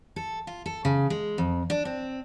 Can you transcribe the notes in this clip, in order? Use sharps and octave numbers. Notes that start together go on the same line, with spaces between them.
A4
F4
A4
C#3
G#3
F2
D4
C4